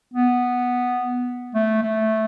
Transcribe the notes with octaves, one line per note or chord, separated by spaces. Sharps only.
B3
A3
A3